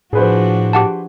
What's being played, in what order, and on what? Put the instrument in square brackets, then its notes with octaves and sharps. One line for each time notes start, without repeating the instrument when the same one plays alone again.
[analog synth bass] A2 [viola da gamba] F3 D4 F#4 [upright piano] G#4 B4 C5
[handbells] G4 F#5 A5